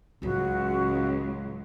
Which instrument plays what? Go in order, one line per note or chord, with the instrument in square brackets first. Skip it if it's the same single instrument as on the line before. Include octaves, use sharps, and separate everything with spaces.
[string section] C#2 [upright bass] A2 F#3 [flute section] F#4